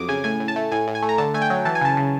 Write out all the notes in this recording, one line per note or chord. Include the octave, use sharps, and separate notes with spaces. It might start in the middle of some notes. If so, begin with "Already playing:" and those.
Already playing: F2 F#3 D6 D#6
C#3 G#5
A2 G#5
A2
A5
A3
A2 G#5
A2
G#5
A3
A#5
D3 A5
A3 G#5
G5
F#3
E3 A5
G#5
C#3 A5
C#3